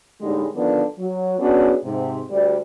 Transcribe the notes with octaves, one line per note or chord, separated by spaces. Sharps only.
A2 D3 G3 G#3 A#3 D#4
D3 D#3 F3 B3 D4 A4
F#3
F#3 B3 C#4 D4 F#4 G#4
G#2 C3
D2 G3 D5